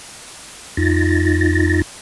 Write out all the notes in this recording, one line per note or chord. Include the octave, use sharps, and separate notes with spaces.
F2 D#4 F4 A6 A#6